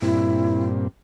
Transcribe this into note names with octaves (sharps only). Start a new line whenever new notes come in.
G2 A#2 C4 E4